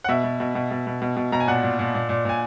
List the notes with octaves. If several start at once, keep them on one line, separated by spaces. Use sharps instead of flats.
F#5
B2 E5
B2
B2
B2
B2
B2
B2
B2
B2 A#5
G#5
A#2 F#5
A#2
A#2
A#2
A#2
A#2 G#5